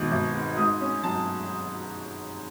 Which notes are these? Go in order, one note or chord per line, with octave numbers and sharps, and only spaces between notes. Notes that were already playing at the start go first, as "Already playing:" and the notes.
Already playing: G#1 B2
G#1
G#2
G#2 D#6
C#4
F#3 A5